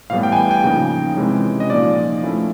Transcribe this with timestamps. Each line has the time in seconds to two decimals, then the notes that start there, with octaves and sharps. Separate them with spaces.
0.10 A2 E3 G3 B3 F5
0.23 G5
0.32 G#5
0.36 G5
0.51 G5
0.64 C#3 F3 A#3 D#4 G5
1.17 C3 E3 G#3 C#4
1.60 D#5
1.70 A#2 F3 A#3 D#4 D5
2.23 F3 A3 C#4 E4